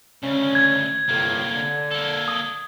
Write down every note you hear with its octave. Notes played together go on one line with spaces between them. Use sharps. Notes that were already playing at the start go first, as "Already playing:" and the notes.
D2 C#3 C#4
G#6
G1 A2 C3 A#3
D3
A#3 A4
D#6